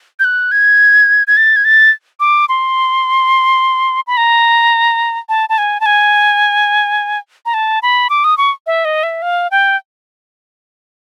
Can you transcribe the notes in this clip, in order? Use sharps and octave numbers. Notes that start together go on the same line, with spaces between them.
G6
F#6
G#6
G#6
A6
G#6
A6
D6
C6
B5
A#5
A5
A5
G#5
A5
G#5
A#5
A5
B5
D6
D#6
C#6
E5
D#5
E5
F5
G5